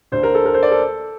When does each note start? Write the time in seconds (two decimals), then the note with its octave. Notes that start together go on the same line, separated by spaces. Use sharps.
0.12 D2 D3 C5
0.23 A#4
0.35 A4
0.45 A#4
0.54 C5
0.63 D5
0.71 A4